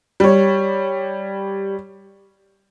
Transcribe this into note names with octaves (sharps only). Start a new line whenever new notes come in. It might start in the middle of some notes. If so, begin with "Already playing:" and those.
G3 C#5